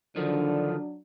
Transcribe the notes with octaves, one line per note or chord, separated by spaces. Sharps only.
D3 D#3 F3 F#3 D4